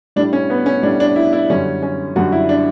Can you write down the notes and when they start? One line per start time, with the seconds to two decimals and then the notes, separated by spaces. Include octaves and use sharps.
0.16 A2 G3 D4
0.33 C#4
0.50 B3
0.66 C#4
0.83 A2 G3 D4
1.00 D4
1.16 E4
1.33 E4
1.50 F#2 D3 G3 C#4
1.83 C#4
2.16 F#2 D3 G3 F#4
2.32 E4
2.49 D4